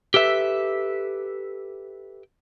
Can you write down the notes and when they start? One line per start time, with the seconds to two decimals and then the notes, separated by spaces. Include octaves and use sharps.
0.14 G4 A4 B4 E5